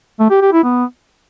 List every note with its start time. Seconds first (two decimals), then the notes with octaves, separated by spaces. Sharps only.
0.19 A3
0.30 G4
0.41 G4
0.52 E4
0.63 B3